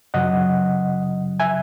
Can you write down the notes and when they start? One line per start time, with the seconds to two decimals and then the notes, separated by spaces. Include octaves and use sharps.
0.14 F#2 C#3 F#3 D#5 F#5
1.40 E5 G#5